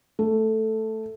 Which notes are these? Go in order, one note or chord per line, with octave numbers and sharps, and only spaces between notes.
A3